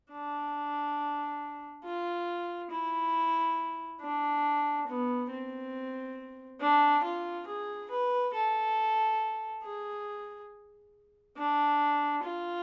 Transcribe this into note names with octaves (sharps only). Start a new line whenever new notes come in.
D4
F4
E4
D4
B3
C4
D4
F4
G#4
B4
A4
G#4
D4
F4